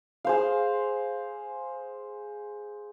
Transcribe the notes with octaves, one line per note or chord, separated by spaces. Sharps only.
G#4 C5 F5